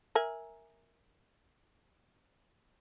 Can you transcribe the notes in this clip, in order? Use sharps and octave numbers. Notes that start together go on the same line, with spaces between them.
A#4 E5 G#5